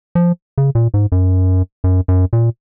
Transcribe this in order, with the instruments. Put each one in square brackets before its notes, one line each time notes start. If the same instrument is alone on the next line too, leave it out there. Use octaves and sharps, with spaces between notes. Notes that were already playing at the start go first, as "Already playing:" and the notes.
[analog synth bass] F3
C#3
A#2
G#2
F#2
F#2
F#2
A#2